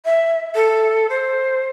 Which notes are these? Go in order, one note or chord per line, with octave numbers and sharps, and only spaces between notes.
E5
A4
C5